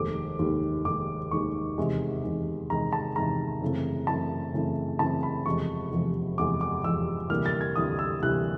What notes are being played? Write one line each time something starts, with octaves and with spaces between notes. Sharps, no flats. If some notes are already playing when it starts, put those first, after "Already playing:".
Already playing: F1 D#2 D#3 G#3 D6
F1 D#2 D#3 G#3
F1 D#2 D#3 G#3 D6
F1 D#2 D#3 G#3 C#6
E2 C3 D#3 G#3
E2 C3 D#3 G#3
E2 C3 D#3 G#3 A#5
A5
E2 C3 D#3 G#3 A#5
F#2 C#3 E3 A3 C4
F#2 C#3 E3 A3 C4 A5
F#2 C#3 E3 A3 C4
F#2 C#3 E3 A3 C4 A5
B5
F1 E2 C3 F3 G#3 C#6
F1 E2 C3 F3 G#3
F1 E2 C3 F3 G#3 D6
D6
F1 E2 C3 F3 G#3 E6
D2 C3 E3 G3 A#3 F6
A6
G#6
D2 C3 E3 G3 A#3 D#6
E6
D2 C3 E3 G3 A#3 F#6